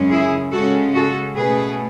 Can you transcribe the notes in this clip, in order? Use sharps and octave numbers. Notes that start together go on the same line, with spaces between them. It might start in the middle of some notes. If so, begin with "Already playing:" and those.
Already playing: F#2 C#3 G#3 C#4
E4 G#4
C#3 G#3 C#4 F#4 A4
F#4 A4
B2 A3 C#4 G#4 B4